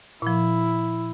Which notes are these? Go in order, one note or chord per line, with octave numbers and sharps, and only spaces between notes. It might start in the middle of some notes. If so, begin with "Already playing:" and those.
A#2 F3 E4